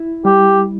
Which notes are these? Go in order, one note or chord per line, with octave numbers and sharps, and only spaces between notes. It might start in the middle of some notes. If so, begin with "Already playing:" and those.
Already playing: E4
G3 G4